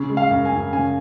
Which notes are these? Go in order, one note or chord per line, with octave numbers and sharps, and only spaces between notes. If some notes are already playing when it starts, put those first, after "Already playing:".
Already playing: C#3
G#3
F5
F#2
G#5
F#2
C#3 G#5